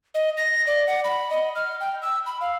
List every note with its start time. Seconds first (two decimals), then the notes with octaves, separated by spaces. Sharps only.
0.15 D#5
0.37 A#6
0.67 D5
0.87 F#5
1.04 B5
1.30 D#5
1.55 F6
1.80 G5
2.02 E6
2.26 B5
2.41 F5